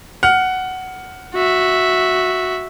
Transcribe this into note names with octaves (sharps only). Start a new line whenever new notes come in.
F#5 F6
F#4 E5